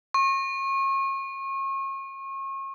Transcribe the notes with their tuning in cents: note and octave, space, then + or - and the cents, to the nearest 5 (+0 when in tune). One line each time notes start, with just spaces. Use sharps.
C#6 -35